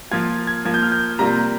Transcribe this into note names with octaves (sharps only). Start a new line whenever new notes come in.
F3 A#3 F4 G#6
G#6
F3 A#3 F4 G#6
G6
F6
G6
C3 G3 A#3 F4 A#5